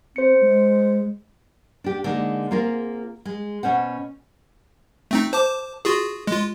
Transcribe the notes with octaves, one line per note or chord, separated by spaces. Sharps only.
C4 C5 C#7
G#3
D4 G4
D3 G#3 A#3 D#4
A#3 C4 F4 G#4 A#4
G#3
B2 C#4 C5 F#5
A3 C4 D#4
C5 A5 D6
F4 F#4 G#4
G#3 F4